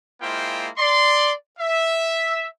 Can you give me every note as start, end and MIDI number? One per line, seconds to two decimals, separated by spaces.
0.22 0.68 56
0.22 0.68 58
0.22 0.68 64
0.22 0.68 65
0.22 0.68 72
0.22 0.68 79
0.78 1.33 74
0.78 1.33 84
1.59 2.47 76